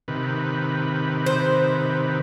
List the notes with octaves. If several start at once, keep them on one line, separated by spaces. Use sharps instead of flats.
C3 D#3 B4
C5